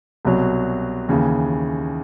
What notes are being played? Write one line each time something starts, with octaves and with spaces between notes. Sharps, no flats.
C2 B2 F#3
D#2 C#3 E3